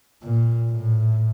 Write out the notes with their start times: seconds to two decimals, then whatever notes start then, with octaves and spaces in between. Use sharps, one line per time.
0.23 A#2
0.72 A2